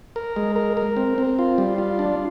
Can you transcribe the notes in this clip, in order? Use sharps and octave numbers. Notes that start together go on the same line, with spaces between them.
A#4
G#3
A#4
A#4
C4
C4
F4
G3
F4
D4